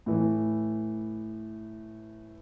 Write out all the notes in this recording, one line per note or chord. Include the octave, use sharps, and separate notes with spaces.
A2 E3